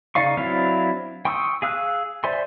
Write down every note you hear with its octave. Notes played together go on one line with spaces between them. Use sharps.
C#3 D#4 D5 F5 C#6
F#3 C4 D4 E4 F5
G5 C6 C#6 D#6 E6
G#4 F5 E6 F#6
C5 D5 E5 G#5 C6